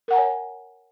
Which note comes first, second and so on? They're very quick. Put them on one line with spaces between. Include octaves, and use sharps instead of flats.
A#4 F#5 A#5 G#5 C#5